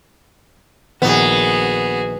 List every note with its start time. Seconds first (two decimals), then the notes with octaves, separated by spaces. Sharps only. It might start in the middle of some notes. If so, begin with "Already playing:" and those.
1.02 A#1 D#3 B3 F#4 G#4